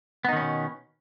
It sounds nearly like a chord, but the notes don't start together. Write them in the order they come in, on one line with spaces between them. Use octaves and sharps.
B3 D#4 D#3 C#4 B2